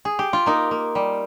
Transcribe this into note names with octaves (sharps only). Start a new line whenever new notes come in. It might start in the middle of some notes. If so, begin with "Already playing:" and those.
G#4
G4
F4
A#3 D#4
A#3
G3